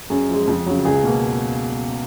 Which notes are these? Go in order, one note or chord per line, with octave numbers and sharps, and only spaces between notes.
F#2 G#4
F3 G#3
F2
C#3 F#3
C#2 G#4
B2 A#3